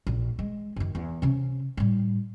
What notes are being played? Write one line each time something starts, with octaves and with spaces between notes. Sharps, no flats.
A#1
G#3
F#2 D#3
E2
C3 C#4
A2 G3